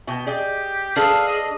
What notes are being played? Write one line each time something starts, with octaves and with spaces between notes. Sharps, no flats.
B2 G5
G4 G#4 D5 D#5
D4 G#4 A4 B4 F5
D#5